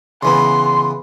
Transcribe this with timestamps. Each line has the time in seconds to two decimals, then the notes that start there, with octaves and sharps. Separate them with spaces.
0.23 C#3 E3 B3 C6